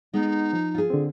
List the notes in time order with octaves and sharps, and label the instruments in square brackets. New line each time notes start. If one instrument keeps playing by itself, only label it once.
[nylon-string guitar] G#3 B3 [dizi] D#4
[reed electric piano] F3
[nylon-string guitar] F4 G#4
[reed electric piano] D3 C4